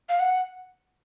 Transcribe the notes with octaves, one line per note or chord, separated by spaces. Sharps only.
F5
F#5